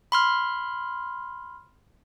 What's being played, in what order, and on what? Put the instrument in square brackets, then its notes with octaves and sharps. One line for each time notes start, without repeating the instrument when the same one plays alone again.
[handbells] B5 C6 F6